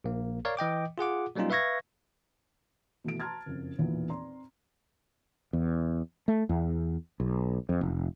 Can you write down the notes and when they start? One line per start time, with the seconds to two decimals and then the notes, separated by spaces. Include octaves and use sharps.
0.04 A#1 A#3
0.45 A#4 C#5 D5 F5
0.57 E3 D#5 G5 D6
0.98 F4 G#4 F#5 D6
1.36 F#3 G3 A#3 C#4 D#4 F4
1.50 B4 E5 F5 C#6 G#6 A#6
3.04 B2 E3 A3 D7
3.20 A5 A#5 C6 F6 G#6 A6
3.46 F#1 F2
3.78 B1 E2 A#2 E3
4.10 C4 D5 A#5 C6
5.53 E2
6.28 A3
6.49 E2
7.20 B1
7.69 F2
7.81 F1